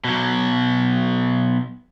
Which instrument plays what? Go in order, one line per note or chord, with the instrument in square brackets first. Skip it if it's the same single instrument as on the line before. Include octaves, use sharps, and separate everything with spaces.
[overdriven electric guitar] B2 F#3